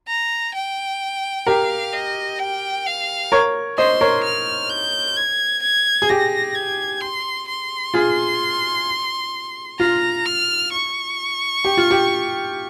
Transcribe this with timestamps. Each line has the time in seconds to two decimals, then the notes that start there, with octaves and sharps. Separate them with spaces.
0.08 A#5
0.55 G5
1.47 G4 A#4 F5
1.93 D#5
2.39 G5
2.86 F5
3.32 A#4 C#5
3.78 C5 D#5 C6
4.01 A#4 C#5
4.24 F6
4.70 G6
5.17 G#6
5.62 G#6
6.02 G#4
6.09 G4 A#6
6.55 G#6
7.01 C6
7.48 C6
7.94 F4 G#4
9.80 F4 A#5
10.26 F6
10.72 C#6
11.65 G4
11.77 F4
11.91 G4